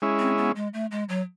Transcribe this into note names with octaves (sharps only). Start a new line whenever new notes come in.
G#3 C#4 E4
C4
B3
G#3
A3
G#3
F#3